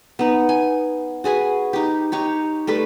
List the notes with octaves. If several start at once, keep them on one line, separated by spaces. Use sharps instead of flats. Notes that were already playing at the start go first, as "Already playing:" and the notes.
B3 D#4
G#5
F#4 G#4 B4 G#5
D#4 G4
D#4 G4 C#5
G3 A3 A4 B4